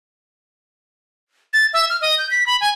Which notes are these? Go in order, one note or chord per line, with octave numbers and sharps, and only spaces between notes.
A6
E5
F6
D#5
G6
B6
B5
G#5